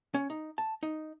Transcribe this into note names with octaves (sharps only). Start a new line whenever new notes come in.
C#4
D#4
A5
D#4